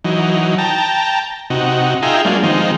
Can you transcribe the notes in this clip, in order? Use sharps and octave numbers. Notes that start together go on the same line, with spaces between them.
E3 F#3 D#4
G5 A5 A#5
C3 D#4 F#4
D#4 F4 G#4 E5 G5 A#5
F#3 G#3 A#3 D4 F4
D#3 F3 G#3 C4 D#4